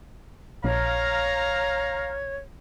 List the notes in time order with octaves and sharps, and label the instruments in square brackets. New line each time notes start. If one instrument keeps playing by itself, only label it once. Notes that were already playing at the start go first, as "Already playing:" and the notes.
[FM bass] A#1 [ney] C#5 [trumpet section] F5 A#5